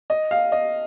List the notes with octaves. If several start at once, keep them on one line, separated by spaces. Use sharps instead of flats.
D#5
F5
D#5